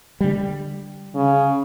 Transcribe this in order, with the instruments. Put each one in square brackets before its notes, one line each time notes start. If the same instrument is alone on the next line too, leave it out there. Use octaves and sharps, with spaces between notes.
[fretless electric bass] D3 G3
[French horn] C#3